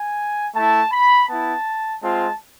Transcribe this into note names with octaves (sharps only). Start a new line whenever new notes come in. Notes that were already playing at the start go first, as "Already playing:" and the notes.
Already playing: G#5
A3 E4 A5
B5
B3 E4 A5
G#3 C4 F4 A5